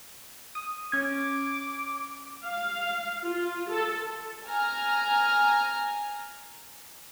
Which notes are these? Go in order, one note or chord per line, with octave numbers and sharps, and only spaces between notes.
D#6
C#4 D6 G#6
F5
F4
A4
G#5 A#5 F6